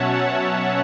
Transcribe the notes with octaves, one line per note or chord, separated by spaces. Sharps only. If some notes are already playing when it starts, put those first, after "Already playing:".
Already playing: B2 F#3 C#4 C#5 E5 F#5 A5
F#5 A5